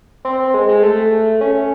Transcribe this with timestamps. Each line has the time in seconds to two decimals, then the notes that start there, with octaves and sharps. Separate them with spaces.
0.25 C4
0.39 C4
0.54 G#3
0.69 G#3
0.83 A3
1.41 C#4